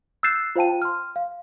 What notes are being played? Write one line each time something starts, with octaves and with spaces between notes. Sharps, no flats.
E6 F#6 G6 A6 C7 E7
F4 C5 F5 G5 A5 D#7
C6 F6
F5